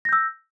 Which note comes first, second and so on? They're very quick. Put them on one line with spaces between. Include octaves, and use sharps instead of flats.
A#6 G6 E6